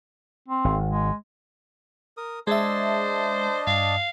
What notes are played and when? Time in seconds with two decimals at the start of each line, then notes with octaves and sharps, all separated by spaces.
0.48 C4
0.64 G#1
0.90 G#3
2.17 A#4 D#6
2.47 G#3 D4 C5 D#5 E5 A5
3.67 G2 F5